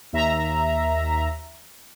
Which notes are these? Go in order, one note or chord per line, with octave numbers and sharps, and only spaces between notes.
D#2 E5 A#5